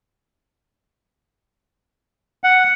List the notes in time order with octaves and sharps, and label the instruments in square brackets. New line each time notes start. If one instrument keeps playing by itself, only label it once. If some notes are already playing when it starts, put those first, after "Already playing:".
[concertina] F#5